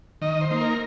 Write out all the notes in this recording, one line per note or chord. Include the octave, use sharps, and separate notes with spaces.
D#3 D#5
C5
A#3 D#4
A#4